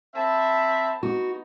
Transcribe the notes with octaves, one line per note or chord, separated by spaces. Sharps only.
C4 E5 A5 B5
B3 D#4 F#4